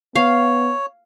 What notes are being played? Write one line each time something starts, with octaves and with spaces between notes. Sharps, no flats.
B3 C#5 F5